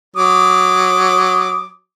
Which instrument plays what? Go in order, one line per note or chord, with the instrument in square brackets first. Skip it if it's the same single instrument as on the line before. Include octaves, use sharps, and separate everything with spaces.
[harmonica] F#3 D6 D#6